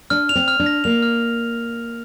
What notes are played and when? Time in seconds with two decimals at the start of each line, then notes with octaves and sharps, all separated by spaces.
0.10 D4 F6
0.29 F7
0.35 C4
0.48 F6
0.60 D4
0.66 A#6
0.84 A#3 F7
1.03 F6